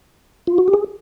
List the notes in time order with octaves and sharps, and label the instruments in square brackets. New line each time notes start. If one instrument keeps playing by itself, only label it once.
[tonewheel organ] F4
F#4
G4
G#4